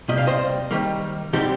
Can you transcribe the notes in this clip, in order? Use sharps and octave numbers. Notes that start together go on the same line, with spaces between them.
C3 G3 A#3 D#5
F5
C5 D#5
D#3 G3 A#3
D3 G3 C4 D#4 G4